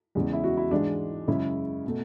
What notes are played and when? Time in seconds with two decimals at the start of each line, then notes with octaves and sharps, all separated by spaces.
0.15 E2 C#3 G#3
0.33 E4
0.44 F#4
0.57 E4
0.71 G#2 E3 G#3 D4
1.27 F#2 C#3 G#3 E4
1.86 B2 A3